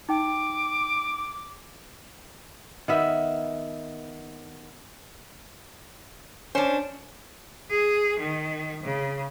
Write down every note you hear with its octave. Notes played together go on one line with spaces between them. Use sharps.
D#4 G5 D6
D#3 B3 E5
C#4 D4 C5
G#4
D#3
C#3